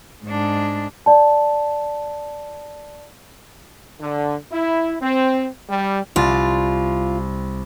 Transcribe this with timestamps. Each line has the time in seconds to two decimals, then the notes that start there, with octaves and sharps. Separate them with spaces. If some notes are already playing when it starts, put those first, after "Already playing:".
0.24 G#2 D4
1.06 D5 A5
4.00 D3
4.52 E4
5.01 C4
5.70 G3
6.16 C2 F4 A6